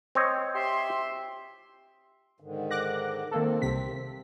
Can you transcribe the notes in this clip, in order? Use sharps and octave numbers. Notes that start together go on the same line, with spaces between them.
C4 C#5 D#5
G4 E5 C6
G#2 D3 D#3
D6 F#6 A#6
D#3 A#3 C4 A4
C2 C3 B6